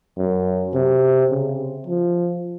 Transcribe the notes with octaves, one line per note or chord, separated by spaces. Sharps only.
F#2
C3
C#3
F3